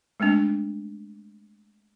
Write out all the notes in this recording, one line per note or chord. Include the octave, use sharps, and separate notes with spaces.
G#3 A3 C4 D4